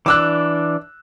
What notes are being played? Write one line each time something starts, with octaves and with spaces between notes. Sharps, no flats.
E3 D4 D6 E6 F#6